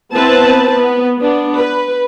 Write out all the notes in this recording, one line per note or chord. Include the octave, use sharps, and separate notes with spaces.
B3 C4 E4 B4 C5 A5
B3 B4
B3 D4
B4